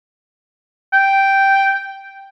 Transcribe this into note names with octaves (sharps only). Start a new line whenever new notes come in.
G5